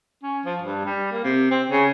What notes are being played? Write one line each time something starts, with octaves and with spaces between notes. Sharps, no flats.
C#4
F3
G2
G3
A#3
C3
C4
C#3